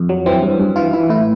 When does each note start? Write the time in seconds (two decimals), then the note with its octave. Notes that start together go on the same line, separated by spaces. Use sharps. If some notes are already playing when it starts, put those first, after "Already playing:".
Already playing: F2
0.09 F#3
0.26 E3 C4
0.42 G2
0.60 G2
0.76 E3 F4
0.93 E3 E4
1.09 A2 E4